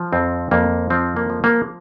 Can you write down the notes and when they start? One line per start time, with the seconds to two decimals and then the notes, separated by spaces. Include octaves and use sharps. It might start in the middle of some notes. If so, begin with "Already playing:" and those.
Already playing: F3
0.12 F2 C4
0.51 F2 A#3
0.90 F3 C4
1.16 A#3
1.30 F3
1.44 A#3